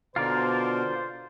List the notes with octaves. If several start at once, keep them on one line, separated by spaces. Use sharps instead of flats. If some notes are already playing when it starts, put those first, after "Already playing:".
B2 D3 F4 A#4 C5 D5